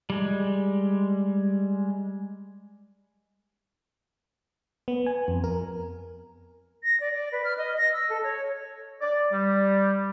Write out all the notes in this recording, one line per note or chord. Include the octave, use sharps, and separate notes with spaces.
G3 G#3
B3
G#5
F2
A#4
A#6
D5
D5
B4
F6
D#5
A#6
E6
A4
C#5
D5
G3